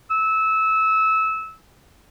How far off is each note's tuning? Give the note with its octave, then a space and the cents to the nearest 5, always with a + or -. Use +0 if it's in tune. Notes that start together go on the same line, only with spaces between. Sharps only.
E6 -20